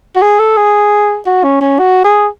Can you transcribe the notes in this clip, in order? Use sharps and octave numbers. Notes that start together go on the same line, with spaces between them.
F#4
G#4
A4
G#4
F#4
C#4
C#4
F#4
G#4